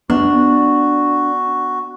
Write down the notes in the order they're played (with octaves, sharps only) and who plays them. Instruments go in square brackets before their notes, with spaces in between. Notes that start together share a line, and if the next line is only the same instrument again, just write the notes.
[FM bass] B3 [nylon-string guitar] D4 [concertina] F#4